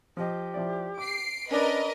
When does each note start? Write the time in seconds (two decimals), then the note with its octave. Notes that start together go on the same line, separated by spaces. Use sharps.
0.17 F3 G4 D#5
0.54 F3 E4 D5
0.98 D6 C7 D7
1.51 C#4 D4 A#4 B4 D#5